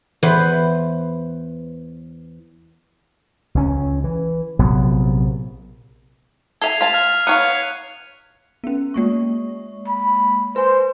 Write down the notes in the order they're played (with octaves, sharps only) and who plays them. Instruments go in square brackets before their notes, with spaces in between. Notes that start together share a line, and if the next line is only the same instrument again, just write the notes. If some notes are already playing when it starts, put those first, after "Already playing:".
[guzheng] E2 B4 C5
[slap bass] C#2 C#4
E3
A#1 C3 F#3 B3
[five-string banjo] A4 E5 G#5 [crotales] G#6 C7 F7
[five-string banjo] F4 A5 [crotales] B6 C7 F7
[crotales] F6
[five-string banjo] B3 C#5 F5 [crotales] F#6 C#7 D#7
[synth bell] B3 C#4
G#3 A#3 C#6
[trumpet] B5
[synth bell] B4 G#5 [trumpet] C5